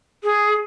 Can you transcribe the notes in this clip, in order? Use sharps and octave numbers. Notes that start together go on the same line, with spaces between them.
G#4